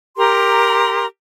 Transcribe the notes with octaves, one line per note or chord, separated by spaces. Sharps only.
G4 A#4 A#5 C6